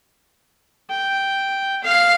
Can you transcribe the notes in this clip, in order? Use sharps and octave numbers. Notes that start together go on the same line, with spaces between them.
G5
F5